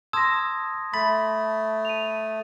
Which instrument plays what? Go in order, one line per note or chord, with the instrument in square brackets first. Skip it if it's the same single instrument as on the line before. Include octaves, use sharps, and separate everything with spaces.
[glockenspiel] A5 D#6 G#6 [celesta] C6 A#6 [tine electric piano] E6
[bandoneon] A3 [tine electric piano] B5 [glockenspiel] A6
[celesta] D#7 F7